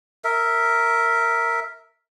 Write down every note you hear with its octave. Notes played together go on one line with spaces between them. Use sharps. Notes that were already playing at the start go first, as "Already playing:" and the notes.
A#4 E5